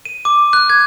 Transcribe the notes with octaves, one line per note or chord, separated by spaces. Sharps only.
D#7
D6
F#6
G#6